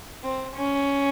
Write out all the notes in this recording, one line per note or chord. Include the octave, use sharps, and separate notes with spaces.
C4
C#4